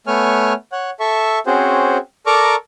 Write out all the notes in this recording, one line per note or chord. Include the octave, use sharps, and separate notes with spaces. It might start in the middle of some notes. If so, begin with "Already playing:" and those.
A3 B3 C#5 G#5 F6
C#5 F#5
A4 E5 C#6
C4 C#4 F#4 G#4 C5
A4 A#4 D5 A#5 C#6 D6